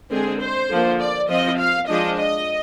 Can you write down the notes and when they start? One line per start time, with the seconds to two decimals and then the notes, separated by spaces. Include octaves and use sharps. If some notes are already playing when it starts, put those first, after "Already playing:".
0.11 D3 G#3 C4 G#4
0.40 C5
0.70 D3 F3 A#3
1.00 D5
1.29 F3 C4 D#5
1.59 F5
1.88 F3 G#3 D4 D#5
2.18 D#5